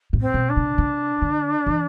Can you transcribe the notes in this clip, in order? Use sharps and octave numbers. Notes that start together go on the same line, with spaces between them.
A2
C4
B2
D4
C3
C3
D3
E3